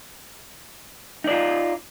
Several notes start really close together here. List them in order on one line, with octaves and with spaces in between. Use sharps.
D#4 D5 F4